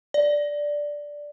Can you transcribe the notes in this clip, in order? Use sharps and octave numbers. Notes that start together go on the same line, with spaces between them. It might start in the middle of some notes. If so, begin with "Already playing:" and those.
D5